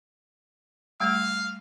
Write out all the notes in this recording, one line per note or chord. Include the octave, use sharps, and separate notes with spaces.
G3 A3 F5